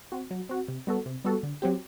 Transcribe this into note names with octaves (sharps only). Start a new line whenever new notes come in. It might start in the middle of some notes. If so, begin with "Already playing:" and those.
C4 F#4
F#3
C4 F#4
C3
G3 B3 F#4 A4
C3
G3 B3 F#4 A4
D3
F#3 C4 G4